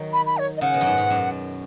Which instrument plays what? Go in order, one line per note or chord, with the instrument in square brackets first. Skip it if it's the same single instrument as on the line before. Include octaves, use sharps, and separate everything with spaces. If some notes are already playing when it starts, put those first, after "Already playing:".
Already playing: [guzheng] D#3 F#3
[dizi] B5
B5
C#5
D#5
[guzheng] C#3 [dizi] F#5
[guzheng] B2
F#2
G#2
G#2
F#2